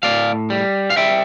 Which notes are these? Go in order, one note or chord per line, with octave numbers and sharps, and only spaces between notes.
A2 D5 F5
G3
F5
G3 E5 G5